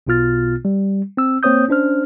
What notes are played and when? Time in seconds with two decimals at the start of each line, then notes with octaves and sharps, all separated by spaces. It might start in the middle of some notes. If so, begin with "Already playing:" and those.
0.07 B1 B2 B3 F4 F6 A6
0.65 G3
1.17 C4 E6
1.43 A#3 C4 C5 C#5 D#6 G6
1.68 C#4 D4 C5 F6